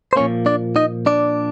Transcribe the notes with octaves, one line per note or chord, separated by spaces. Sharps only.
C5
A#2 F3 A#3 C#4 C#5
D4 D5
D#4 D#5
D4 D5